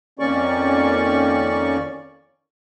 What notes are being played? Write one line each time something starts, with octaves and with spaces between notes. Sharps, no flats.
F2 D#3 A#3 C#4 D5 C#6